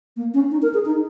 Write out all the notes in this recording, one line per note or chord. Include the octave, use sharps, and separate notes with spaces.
A#3
C#4
D#4
A#4
G#4
D#4